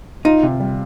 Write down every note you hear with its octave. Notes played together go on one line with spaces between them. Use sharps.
D#4 F4
C3
G3